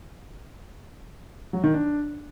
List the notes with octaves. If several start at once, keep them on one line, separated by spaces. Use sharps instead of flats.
F#3
D#3
D4